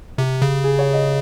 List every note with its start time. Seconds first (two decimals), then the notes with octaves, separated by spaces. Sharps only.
0.18 C3 G4
0.42 C#3
0.64 G#4
0.79 C#5
0.93 D#5